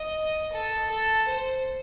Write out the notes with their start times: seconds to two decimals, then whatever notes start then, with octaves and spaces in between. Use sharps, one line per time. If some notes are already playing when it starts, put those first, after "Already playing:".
Already playing: D#5
0.52 A4
0.90 A4
1.28 C5